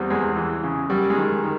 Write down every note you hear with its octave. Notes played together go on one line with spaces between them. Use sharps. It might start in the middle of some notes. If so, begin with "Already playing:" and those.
Already playing: E2 G3 C4
E2 G#3
E3
C#3
F#2 G3
G#3
D#3
D#3